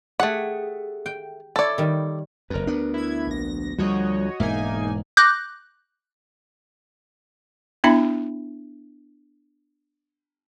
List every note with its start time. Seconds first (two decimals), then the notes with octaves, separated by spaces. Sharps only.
0.20 A3 G4 G#4 F#5
1.06 G5
1.56 E4 A4 C#5 D5
1.78 D#3 G3
2.50 F#1 F2 A#4 B4
2.67 D2 B3 D4
2.94 E4 G#6
3.27 A#1 A#6
3.78 D2 F3 G3 F#4 C#5 D#5
4.40 E1 G#2 A#3 D#4 E5 G#5
5.17 D6 F#6 G6 A#6
7.84 B3 D4 E4 E5 B5